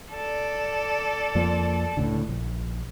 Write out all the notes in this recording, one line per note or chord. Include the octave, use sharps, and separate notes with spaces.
A4 D5
F2 F3 A#3
C#2 A2 D3
A#1